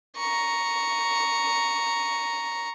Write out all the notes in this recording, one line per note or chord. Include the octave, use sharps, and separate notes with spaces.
A#5 C#6